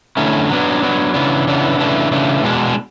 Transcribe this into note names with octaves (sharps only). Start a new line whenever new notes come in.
D3 A3 C#4 E4
F#3 B3 D4
F#3 B3 D4
C#3 E3 B3 D4
C#3 E3 B3 D4
C#3 E3 A3 D4
C#3 E3 A3 D4
B2 G#3 D4